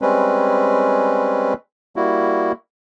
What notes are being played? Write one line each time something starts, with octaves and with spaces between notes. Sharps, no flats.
G3 G#3 C4 C#4 B4
G3 A#3 E4 F#4